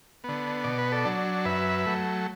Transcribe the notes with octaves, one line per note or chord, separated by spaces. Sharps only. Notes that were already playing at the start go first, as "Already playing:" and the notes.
D3 B3
B2 D5
B4
A4 D5
F#3 D4
F#2 B4 E5
F#3 A3